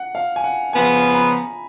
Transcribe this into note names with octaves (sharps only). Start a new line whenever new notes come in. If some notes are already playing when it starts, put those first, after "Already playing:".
Already playing: F#5
F5
G#5
F#5
C#3 F3 B3 G#5
A#5
B5